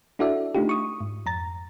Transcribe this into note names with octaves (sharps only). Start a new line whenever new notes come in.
D4 E4 F#4 A4 D5 E5
A3 D4 D#4 F4 G4
C#6 D#6
G#2
F2 A#5 A6